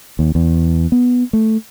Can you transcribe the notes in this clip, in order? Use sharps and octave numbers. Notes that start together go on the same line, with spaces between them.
D#2
E2
B3
A3